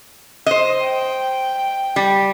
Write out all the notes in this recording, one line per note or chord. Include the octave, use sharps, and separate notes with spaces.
C5 D#5
G5
G3